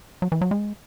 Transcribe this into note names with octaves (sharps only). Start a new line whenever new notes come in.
F#3
E3
F#3
G#3